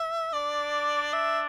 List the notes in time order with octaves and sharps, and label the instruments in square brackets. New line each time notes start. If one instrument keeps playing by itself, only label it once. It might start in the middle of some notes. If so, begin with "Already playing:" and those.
Already playing: [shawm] E5
[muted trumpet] D4 [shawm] D5
[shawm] E5